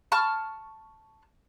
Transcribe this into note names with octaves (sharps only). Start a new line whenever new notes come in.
A5 C#6 F6